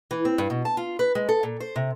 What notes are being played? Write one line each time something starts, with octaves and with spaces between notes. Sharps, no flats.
E3
C4
G2
B2
A5
F4
B4
G#3
A4
A#2
C5
C3